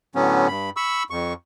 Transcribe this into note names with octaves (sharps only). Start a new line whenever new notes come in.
A2 D3 F#3 B3 C#4
G2 B5
B5 C#6 E6
F2 C#6